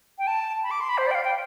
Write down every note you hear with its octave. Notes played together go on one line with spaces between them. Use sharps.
G5
A5
B5
D6
C6
B5
C5
D5
G5
F5
G5